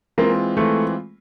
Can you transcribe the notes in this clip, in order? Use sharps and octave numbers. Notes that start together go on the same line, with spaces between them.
E3 G#3 A#3 C4 F4
E3 G#3 A3 C4 F4